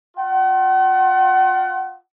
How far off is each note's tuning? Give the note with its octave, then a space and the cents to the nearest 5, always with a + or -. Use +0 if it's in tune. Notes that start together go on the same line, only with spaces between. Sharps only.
F4 +30 F#5 +40